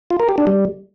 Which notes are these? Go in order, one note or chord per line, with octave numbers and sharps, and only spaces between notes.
F4
A#4
G4
D4
G3